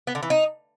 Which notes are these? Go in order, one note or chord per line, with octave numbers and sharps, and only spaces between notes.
B3
D3
E3
D#4